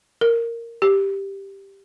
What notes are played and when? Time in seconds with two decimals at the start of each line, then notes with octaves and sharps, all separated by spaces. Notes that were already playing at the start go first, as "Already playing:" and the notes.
0.21 A#4
0.82 G4